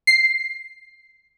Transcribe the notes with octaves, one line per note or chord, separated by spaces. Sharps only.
C7